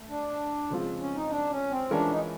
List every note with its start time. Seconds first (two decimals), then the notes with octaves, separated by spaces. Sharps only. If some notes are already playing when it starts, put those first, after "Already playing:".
Already playing: A3
0.10 D4
0.70 C#3 F3 G#3 C4 F4
1.01 C#4
1.16 D#4
1.30 D4
1.51 C#4
1.71 C4
1.91 E3 G#3 C#4 D4 F4 A#4
2.11 D#4